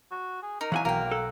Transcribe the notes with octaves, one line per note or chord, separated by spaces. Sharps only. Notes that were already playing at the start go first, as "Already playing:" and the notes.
F#4
G#4
D#4 A#4
E3 F#3 F5 F#5 G#5 B6
B1 A#3 F#4 A#4 F5 G5
A4 F#6